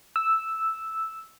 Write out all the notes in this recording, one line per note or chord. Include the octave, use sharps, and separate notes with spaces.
E6